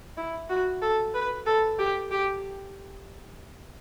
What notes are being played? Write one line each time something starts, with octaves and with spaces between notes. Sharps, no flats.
E4
F#4
A4
B4
A4
G4
G4